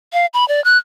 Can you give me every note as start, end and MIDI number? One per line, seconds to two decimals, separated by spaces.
0.13 0.26 77
0.34 0.47 83
0.48 0.63 74
0.64 0.78 90